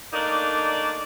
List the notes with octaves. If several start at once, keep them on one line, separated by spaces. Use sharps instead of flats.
A3 A#3 D4 D#4 D5